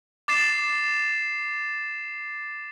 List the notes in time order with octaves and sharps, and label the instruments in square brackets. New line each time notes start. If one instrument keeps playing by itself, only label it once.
[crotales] D6 A6 C7 E7